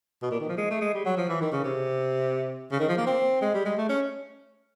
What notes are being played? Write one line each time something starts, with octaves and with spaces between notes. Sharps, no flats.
B2
A#2
D#3
F3
G#3
A3
G#3
G3
F#3
F3
E3
D#3
C#3
C3
C#3
D#3
F3
A#3
C4
G#3
G3
G#3
A3
C#4